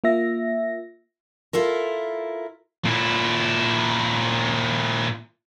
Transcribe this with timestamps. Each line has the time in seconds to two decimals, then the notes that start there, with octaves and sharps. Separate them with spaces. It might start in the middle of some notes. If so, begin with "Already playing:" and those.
0.04 A#3 F4 E5 A#6
1.53 E4 F4 A4 A#4
2.86 A#2 E4